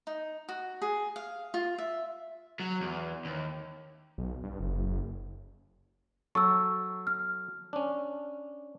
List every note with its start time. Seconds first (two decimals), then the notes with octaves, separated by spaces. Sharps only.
0.07 D#4
0.49 F#4
0.82 G#4
1.16 F5
1.54 F4
1.78 E5
2.60 F#3
2.81 E2
3.25 D#2
4.18 B1
4.43 G2
4.60 F#1
4.87 F#1
6.35 F#3 A4 C#6 E6
7.07 F6
7.73 C#4 D4